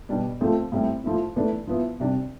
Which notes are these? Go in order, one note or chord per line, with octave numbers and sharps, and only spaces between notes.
B2 G3 D4
F3 A3 C4
A2 G3 C4 E4
F3 A3 E4
E3 A3 D4
F3 B3 E4
C3 G3 D4